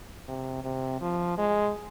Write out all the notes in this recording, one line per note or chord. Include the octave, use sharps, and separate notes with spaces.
C3
C3
F3
G#3